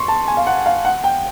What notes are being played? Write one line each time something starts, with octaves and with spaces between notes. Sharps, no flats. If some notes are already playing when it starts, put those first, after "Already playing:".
Already playing: C6 C#6
A5
G#5
F5
F#5
F5
F#5
G5